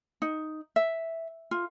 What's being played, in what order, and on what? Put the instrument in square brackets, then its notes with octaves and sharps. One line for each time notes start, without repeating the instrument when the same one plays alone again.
[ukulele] D#4
E5
F4